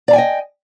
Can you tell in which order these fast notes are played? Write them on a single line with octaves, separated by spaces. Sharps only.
D5 A#5 G#5 G5 D#5